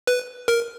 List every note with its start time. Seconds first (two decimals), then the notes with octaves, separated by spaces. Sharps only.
0.07 B4
0.48 A#4